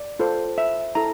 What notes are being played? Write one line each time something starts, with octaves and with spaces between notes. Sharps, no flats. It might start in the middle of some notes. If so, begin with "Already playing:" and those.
Already playing: D5
F4 A4 C5
E5
E4 A4 A#5